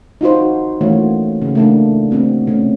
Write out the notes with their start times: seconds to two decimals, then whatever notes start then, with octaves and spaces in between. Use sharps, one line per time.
0.21 D#4 F4 F#4 C5
0.81 E3 A3 A#3 C#4 F#4 C#5
1.42 C#3
1.55 A3 A#3 D4
2.11 A3 B3 C4 F#4
2.47 C3 A3 C#4